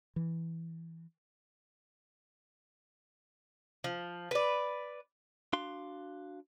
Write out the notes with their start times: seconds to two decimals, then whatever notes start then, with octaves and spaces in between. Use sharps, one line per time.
0.16 E3
3.84 F3
4.31 B4 D5
5.53 D4 F#4 F5 C6